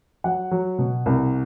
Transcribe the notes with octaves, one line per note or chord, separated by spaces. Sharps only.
F#3 F#5
F#3
B2
C2